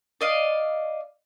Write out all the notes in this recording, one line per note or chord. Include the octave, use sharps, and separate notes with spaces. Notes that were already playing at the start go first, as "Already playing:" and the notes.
D5 D#5 F5